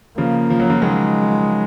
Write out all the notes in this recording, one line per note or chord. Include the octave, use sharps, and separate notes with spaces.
C#3 F3 A#3
F3
F#3
C#3 F3
D#3 F#3 G#3